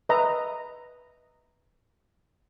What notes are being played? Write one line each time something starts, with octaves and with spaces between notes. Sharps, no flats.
B4 D#5 E5 A#5